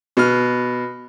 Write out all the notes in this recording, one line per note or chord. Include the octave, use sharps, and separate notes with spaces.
B2 F6